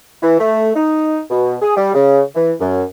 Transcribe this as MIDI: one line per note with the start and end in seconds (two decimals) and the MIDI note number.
0.22 0.37 52
0.39 0.70 57
0.75 1.20 63
1.30 1.56 47
1.61 1.74 68
1.76 1.90 55
1.94 2.21 49
2.35 2.52 52
2.61 2.84 42